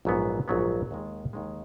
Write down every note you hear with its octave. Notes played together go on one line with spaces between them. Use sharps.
A#1 G#2 F#3 B3
A#1 G#2 F#3 B3
D#2 D#3 G#3
D#2 D#3 G#3